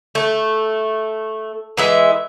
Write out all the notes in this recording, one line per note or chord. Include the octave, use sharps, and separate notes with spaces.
A3
E3 G#3 E5